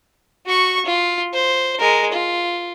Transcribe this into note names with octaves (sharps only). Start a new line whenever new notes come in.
F#4 C#6
F4
C5
G#3 A#4
F4